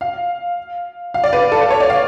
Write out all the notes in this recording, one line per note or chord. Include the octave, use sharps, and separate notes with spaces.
F5
F5
D5
B4
A4
B4
C#5
D5
F5